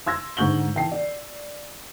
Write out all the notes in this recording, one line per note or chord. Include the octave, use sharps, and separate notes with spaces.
C6 E6 G#6 A#6
G#2 D3 C#6 G6 F#7 G7
E3 G5 A5 C7
D5